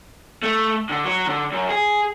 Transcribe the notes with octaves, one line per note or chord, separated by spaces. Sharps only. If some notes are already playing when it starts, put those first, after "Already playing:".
A3
D3
F#3
D3
F#2
G#4